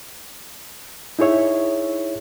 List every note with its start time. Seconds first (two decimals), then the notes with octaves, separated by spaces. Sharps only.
1.19 D#4 E4 G#4 C#5 E5